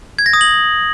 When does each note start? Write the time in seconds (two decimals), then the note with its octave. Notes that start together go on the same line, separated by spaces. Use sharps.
0.19 G#6
0.26 A#6
0.33 D#6
0.41 F#7